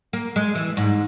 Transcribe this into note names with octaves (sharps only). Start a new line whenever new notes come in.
A#3
G#3
E3
G#2